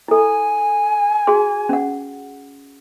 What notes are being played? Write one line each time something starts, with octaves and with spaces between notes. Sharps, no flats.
E4 A4 G#5
F#4 G#4 C6
C#4 F#5